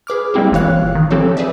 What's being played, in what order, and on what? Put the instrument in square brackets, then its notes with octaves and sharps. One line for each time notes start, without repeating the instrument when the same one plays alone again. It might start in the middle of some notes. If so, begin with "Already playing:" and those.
[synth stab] G#4 B4 D6 F6
G3 G#3 A#3 C4 E4 G4
G1 A#2 E3 C#5 F5 F#6
D#3
E3 F3 C4 G4 A4 C#5
G4 G#4 B4 D5 E5